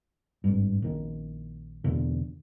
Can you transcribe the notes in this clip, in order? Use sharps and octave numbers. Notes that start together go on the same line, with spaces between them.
G#1 G2
A#1 D#3
E2 B2 D3